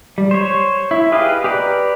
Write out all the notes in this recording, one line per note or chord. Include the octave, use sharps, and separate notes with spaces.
G3
C5 C#5
E4
G4 G#4 B4 D#5 F5
G4 B4 D5 A#5